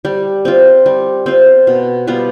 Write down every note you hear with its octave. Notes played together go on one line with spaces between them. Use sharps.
G3
C4 F4
G3
C4 F4
B2
G3 B3 F4